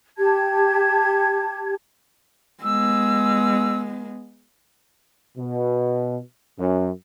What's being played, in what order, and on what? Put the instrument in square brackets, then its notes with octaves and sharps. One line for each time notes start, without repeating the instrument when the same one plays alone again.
[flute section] G4 A5 G#6
[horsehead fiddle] G#3 B3 [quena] E6
[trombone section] B2
F#2